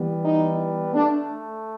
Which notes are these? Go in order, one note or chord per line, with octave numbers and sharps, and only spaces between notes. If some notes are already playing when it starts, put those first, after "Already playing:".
Already playing: E3 G3 B3
D#4
A3 D4